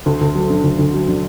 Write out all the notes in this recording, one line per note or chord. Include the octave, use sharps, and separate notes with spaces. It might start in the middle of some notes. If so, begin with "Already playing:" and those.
D2
D2
F#3
D3
D2
D2
F#3
D3